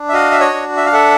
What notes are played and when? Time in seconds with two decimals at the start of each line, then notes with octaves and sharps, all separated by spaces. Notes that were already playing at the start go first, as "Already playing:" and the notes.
Already playing: D4
0.09 E5
0.13 F#4 D#5 F5
0.31 E5
0.40 C#5 D#5
0.54 D4
0.77 E5
0.85 F5
0.93 A4 E5 F#5